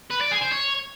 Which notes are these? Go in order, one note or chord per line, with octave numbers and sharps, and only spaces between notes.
B4
D5
G#4
C5
C#5